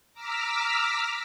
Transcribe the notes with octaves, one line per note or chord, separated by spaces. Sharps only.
A#5 D6 E6 F6 B6